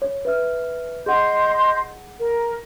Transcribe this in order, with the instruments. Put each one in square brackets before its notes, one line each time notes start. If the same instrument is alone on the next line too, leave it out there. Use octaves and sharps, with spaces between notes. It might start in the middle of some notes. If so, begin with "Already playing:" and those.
[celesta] C#5
B4 E5 F6
[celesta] G#4 F#5 [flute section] D#5 C6 G6
[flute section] A#4